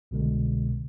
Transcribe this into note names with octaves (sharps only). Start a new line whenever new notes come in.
C2 B2 D3 G#3